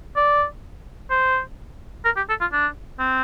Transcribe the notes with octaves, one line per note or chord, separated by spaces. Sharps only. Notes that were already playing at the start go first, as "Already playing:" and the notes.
D5
C5
A#4
G4
A4
F4
D4
C4